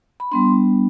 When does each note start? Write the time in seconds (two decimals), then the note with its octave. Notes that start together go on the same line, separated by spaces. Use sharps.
0.20 B5
0.31 G3 B3 D4 C6